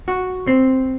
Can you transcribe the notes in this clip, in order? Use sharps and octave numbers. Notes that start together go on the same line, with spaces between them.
F#4
C4